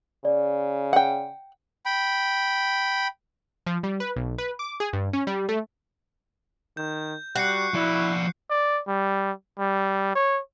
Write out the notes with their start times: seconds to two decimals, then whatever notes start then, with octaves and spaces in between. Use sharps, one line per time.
0.25 C#3 D5
0.93 F#5 G5
1.86 G5 B5
3.66 F3
3.83 G3
4.00 B4
4.16 B1
4.38 B4
4.59 D6
4.80 G#4
4.93 G2
5.13 C#4
5.27 G3
5.49 A3
6.77 D#3 G6
7.36 G3 F#4 F#6 C7 C#7
7.74 F3 E4 D5
8.50 D5
8.87 G3
9.59 G3
10.15 C#5